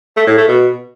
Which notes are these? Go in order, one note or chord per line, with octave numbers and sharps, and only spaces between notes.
A3
A2
A3
B2